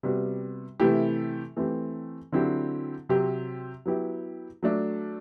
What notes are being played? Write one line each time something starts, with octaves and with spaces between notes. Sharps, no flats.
C3 G3 B3 F#4
C3 E3 A3 E4 G4
E3 A3 C4 G4
D3 F#3 C4 E4 G4
C3 F#3 C4 G4
F#3 B3 E4 G4
F#3 A3 D4